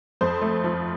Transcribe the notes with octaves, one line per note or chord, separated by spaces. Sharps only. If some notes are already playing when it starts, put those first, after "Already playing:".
F2 C5
A3
F3